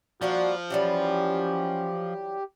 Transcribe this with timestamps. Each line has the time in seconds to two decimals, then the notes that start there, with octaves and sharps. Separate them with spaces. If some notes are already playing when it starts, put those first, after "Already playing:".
0.22 F3 G3 A#3 D4 F#4
0.70 E3 F#3 G3 C#4 G4